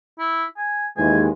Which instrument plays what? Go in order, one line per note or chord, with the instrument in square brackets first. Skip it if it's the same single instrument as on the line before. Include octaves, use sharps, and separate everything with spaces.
[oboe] E4
G#5
[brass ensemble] D#2 E3 G#3 [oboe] G#5